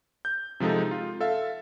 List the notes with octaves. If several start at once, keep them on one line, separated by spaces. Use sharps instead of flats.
G6
C3 F3 G#3 D#4 A4
F4
A4 E5 F5